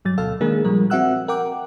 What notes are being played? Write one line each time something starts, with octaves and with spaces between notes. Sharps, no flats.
G2 F#3 A6
D2 B2 A4 F5 E6
D#3 G#3 A#3 D4 G#4 A#4
A#2 F3 G3 A#4
C4 F#4 E5 F#5 E6 F#6
A#4 F#5 G5 D6